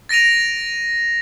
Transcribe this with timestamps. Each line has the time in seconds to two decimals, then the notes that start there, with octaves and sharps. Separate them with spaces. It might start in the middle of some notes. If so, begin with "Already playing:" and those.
0.09 A6 A#6 D7 D#7 F7